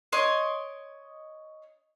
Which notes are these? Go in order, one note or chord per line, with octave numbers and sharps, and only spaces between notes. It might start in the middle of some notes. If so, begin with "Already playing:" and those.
C#5 D#5 C6 D6